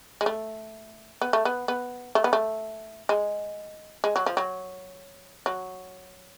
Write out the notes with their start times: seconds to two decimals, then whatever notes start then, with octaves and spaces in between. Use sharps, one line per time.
0.21 G#3
0.26 A3
1.22 B3
1.33 A3
1.45 B3
1.68 B3
2.15 A3
2.24 B3
2.33 A3
3.09 G#3
4.04 G#3
4.16 F#3
4.26 F3
4.37 F#3
5.46 F#3